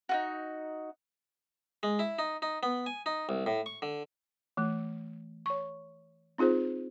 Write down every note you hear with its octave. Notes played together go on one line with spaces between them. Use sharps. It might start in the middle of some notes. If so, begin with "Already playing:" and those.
D#4 F4 F#4
G#3
E4
D#4
D#4
B3
G#5
D#4
C2
A2
C#6
D3
E3 A3
C#5 C#6
C4 D#4 F4 G#4 C5